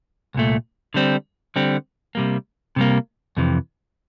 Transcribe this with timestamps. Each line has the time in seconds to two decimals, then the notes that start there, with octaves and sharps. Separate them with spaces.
0.35 C2 A#2 A3
0.94 D3 G3 C4
1.56 D3 G3 C4
2.15 C3 G3 A#3
2.76 C3 G3 A#3
3.37 F2 C3 E3